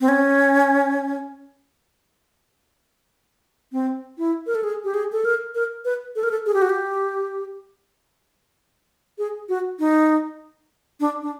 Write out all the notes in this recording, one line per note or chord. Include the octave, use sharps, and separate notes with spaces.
C4
C#4
C4
E4
A#4
A4
G#4
G4
G#4
A4
A#4
A#4
B4
A4
A#4
A4
G#4
G4
F#4
G4
G#4
F#4
D#4
D4
D4